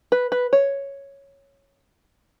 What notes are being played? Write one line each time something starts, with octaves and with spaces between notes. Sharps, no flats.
B4
B4
C#5